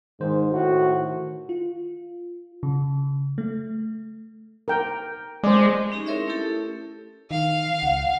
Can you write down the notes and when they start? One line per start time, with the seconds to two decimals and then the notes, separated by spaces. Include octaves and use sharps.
0.20 G#2 D#3 C5
0.53 A2 F#4
1.49 F4
2.63 C#3
3.38 A3
4.68 A#4 G5
5.44 G#3 C5 D5
5.92 C#4 D#4 G4 G#4
6.06 C4 E4 A#4 C#5 E5
6.28 A3 C#4 E4 G4 A4
7.31 D#3 F5
7.83 C#2 F#5